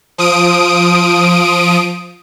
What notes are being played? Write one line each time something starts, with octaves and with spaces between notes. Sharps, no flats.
F3 D#6 D7